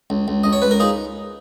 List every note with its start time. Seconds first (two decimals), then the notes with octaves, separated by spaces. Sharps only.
0.10 C#2
0.28 C#2
0.44 C#2 D#5
0.53 C#5
0.62 C#2 B4
0.71 A#4
0.80 D#4 F4 G#4